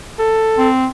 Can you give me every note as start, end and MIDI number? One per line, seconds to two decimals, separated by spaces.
0.19 0.69 69
0.58 0.88 60